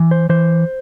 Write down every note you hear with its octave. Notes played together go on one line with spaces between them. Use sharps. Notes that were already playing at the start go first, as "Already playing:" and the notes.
Already playing: E3
C5
E3 C5